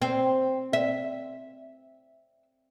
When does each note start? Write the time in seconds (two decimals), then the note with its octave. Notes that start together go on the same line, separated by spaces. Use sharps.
0.02 C4
0.73 E5